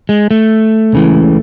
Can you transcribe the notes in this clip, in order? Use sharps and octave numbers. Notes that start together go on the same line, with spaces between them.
G#3
A3
C#2 C#3 E3